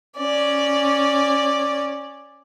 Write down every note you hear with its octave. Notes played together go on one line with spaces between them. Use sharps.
C#4 D5